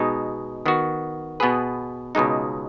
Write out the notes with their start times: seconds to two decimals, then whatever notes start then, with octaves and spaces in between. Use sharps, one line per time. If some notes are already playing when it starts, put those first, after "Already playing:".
Already playing: B2 G#3 D#4
0.66 D#3 B3 F#4
1.40 B2 B3 G#4 B4
2.15 C#2 B2 G#3 D#4